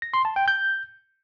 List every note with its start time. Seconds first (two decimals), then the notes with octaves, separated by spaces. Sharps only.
0.02 A#6
0.14 C6
0.25 A5
0.36 G5
0.48 G6